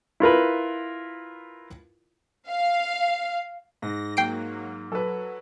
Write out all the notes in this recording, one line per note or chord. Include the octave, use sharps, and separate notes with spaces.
E4 F4 A#4 B4
F5
G#2 A#6
F#3 A#3 G5 C7 D7
F#3 A4 B4